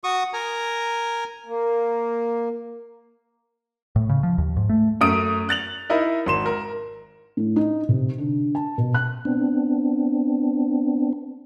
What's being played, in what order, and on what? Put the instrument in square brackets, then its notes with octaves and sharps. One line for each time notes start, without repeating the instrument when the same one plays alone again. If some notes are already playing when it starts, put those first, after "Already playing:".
[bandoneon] F#4 C#6 D#6
A#4 G#5 A#5
[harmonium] A#3
[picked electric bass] A2
C#3
F3
D#2
G#2
A3
[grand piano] F#2 A3 D#6 D7
F#6 A6 F7 F#7
D#4 E4 A#4 D#5
G#1 C6 E7
A#4
[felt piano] A2
D#4
C3
D3
A5
B2
F#6
[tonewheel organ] B3 C4 D4